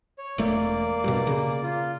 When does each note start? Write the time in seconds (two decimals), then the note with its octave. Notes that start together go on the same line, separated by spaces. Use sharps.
0.18 C#5
0.38 E1 A3 A#3 D5
1.04 G2 B2
1.27 C#3
1.63 F4